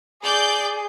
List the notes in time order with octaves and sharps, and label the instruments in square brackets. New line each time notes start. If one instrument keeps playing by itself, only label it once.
[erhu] G#4 [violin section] D5 G6